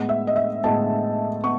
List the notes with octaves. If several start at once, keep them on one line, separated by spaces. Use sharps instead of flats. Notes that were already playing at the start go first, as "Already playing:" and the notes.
Already playing: A2 G#3 B3
E5
D#5
E5
A2 G#3 B3 A5
B3 C#6